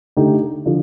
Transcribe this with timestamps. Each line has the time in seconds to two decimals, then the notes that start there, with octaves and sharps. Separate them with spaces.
0.17 D3 A3 D#4 G4
0.66 D3 F3